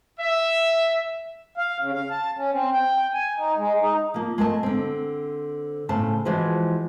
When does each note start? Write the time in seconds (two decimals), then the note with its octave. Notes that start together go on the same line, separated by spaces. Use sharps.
0.19 E5
1.58 F5
1.80 C#3
1.95 F5
2.11 A5
2.37 C#4
2.52 C4
2.73 G5
3.14 G#5
3.37 D#4
3.57 G#3
3.81 D#4
4.14 F3 A#3
4.38 G#3 A3 A#4 A5
4.63 D3 C4
5.89 A2 C#3 C5 A5
6.25 E3 F3 G#3 F#4 C5